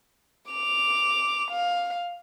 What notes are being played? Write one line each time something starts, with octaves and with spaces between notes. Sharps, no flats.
D6 F7
F5